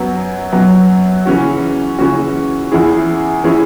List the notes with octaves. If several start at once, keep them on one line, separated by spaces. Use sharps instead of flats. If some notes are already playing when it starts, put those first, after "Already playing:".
Already playing: F#2 F#3 B3
F#2 F#3 B3
C#3 E3 C#4 F#4
C#3 E3 C#4 F#4
E2 E3 C#4 E4 G#4
E3 C#4 E4 G#4